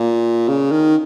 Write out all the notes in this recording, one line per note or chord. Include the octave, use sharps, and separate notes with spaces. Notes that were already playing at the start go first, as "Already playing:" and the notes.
Already playing: A#2
C#3
D#3